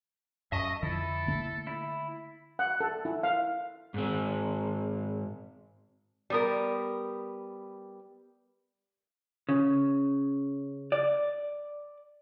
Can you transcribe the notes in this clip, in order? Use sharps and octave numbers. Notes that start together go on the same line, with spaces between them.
F#2 D#5 E5 A5 C#6
F2 D3 F3 E4 A4
D3 A3 A#3
E4
F#5
A4
E4
F5
G#2 C4
G3 B3 A#4
C#3
D5